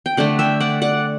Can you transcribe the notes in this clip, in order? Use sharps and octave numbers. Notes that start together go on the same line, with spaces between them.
G5
D3 A3 D5 F#5
E5 G5
D5 F#5
D5 F#5